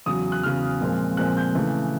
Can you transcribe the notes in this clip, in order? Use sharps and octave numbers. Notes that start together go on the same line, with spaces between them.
E2 C#3 F#3 D#6
F#6
E2 C#3 F#3 F6
A#2 F3 G#3 C4
A#2 F3 G#3 C4 F#6
G6
C#3 E3 A3